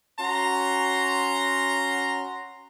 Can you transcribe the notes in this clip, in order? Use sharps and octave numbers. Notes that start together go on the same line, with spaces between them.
C#4 F#4 A#5 C6